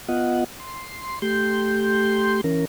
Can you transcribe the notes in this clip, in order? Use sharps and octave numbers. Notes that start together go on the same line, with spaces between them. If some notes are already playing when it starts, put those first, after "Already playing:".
B3 F4 D#5 F#5
C6
A3 G4 C6 G6
E3 C#4 A#4